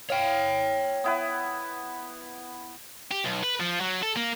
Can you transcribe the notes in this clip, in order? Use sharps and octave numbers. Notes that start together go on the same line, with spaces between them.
C#5 F5 G5
B3 E4 B4
G4
B1
B4
F3
F#3
A4
A#3